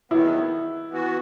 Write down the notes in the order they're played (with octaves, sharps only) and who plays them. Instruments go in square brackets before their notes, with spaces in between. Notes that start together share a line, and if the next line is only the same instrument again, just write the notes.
[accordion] E2 D#3 F#3 B3 [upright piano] E4
[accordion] E3 B3 F#4